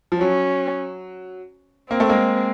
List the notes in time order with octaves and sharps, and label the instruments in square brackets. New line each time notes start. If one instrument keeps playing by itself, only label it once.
[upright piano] F3
[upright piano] F#3 [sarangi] C#4
[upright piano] A#3 [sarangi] C4
[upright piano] A3
G#3 A#3